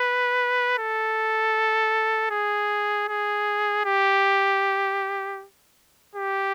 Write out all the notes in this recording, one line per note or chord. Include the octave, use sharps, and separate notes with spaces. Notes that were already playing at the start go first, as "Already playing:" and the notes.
Already playing: B4
A4
G#4
G#4
G4
G4